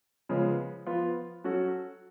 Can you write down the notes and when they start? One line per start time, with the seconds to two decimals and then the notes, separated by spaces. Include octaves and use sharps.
0.29 C#3 F3 G#3 B3
0.86 F3 B3 F4
1.44 F#3 C#4 F#4 A4